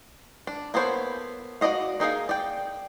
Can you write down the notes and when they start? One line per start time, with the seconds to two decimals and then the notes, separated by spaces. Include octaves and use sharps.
0.47 D4
0.74 A#3 B3 A4 C5 C#5
1.61 F#4 A#4 D5 D#5 F5
2.00 A#3 D#4 G#4 F5
2.29 D5 G5